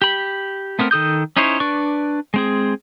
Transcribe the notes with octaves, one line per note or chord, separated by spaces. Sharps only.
G4 B5
A3 B3 C4 A#4
D#3 A4 D#6 G6
C#4 D#4 E4 C5 C#5
D4 B4 D5 C#6
G#3 C4 G#4